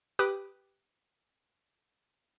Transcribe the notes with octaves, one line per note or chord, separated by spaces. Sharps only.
G4 B4 D6 D#6 F#6